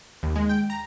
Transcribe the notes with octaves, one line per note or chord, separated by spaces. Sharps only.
D#2
G#3
G5
A#5